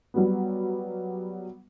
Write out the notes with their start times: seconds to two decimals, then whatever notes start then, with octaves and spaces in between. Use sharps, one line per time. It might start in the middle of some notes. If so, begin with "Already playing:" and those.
0.14 F#3 G3 B3